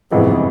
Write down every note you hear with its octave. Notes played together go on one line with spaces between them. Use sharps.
G1 F2 G#2 C3 E3 G#3